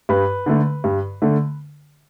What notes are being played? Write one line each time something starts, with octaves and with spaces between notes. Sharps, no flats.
G2 B4
D3 A3
G2
D3 A3